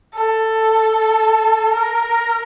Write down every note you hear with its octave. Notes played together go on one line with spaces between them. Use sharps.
A4
A#4